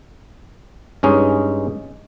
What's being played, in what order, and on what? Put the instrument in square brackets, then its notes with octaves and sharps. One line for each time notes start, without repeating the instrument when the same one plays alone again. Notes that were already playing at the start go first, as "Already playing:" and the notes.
[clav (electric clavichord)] G2 G#3 C#4 D#4